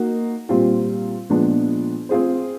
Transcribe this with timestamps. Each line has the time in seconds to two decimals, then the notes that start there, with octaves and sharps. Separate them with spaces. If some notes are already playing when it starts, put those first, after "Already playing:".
Already playing: A#3 D#4 F#4
0.49 A#2 G3 C4 F4
1.30 A#2 F3 G#3 B3 D4
2.09 C4 F4 G#4 C5